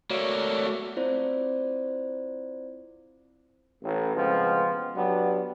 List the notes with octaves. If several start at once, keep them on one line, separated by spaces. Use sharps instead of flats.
A3 A#3 F#4 C#5 D5
C4 E4 F4 C5 D5
A1 A2
C#2 B2 F3 C4
F#3 B3 D4 G4